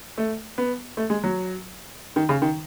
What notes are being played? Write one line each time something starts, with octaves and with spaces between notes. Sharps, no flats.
A3
B3
A3
G#3
F#3
D#3
C#3
D#3